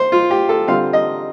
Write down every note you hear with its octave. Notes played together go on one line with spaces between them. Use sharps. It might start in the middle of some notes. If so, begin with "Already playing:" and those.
Already playing: C5
F4
G4
A4
D3 G3 C4 F4 F5
D#5